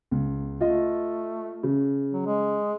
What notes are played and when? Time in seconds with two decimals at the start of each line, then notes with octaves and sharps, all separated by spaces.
0.11 C#2
0.61 A3 F4 D#5
1.63 C#3
2.12 F#3
2.26 G#3